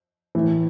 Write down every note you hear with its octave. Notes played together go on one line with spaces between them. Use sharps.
A2 E3